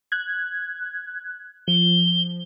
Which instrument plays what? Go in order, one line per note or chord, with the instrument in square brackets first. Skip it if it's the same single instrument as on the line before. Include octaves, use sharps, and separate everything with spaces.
[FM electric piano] F#6 G#6
[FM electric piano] F3 [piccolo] G7